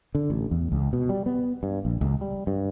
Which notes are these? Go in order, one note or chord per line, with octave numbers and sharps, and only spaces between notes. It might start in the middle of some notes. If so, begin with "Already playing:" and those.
D3
A1
E2
C#2
B2
G3
B3
G2
A#1
C#2
G3
G2